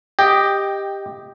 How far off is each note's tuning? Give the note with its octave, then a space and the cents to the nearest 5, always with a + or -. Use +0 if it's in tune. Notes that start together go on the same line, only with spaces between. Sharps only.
G4 +10 D#5 +0 G5 +0